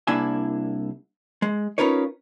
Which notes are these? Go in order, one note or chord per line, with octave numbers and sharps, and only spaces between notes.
C2 A#3 D4 E4 E5 G#5
G#3
C#4 D#4 F4 A#4 B4 C#5